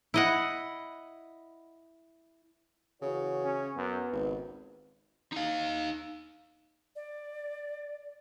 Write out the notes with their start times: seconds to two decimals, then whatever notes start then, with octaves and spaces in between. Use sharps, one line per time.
0.14 E4 D#5 F#5
3.02 C#3 E3 F#4 C#5
3.44 C#4
3.76 F#2 B3
4.13 G#1 C#2
5.32 D#4 F5
6.95 D5